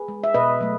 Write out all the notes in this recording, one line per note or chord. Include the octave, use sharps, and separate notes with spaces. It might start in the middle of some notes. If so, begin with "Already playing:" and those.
Already playing: G#4 B4
G#3
E5
B2 B4 D#5
F#3 A3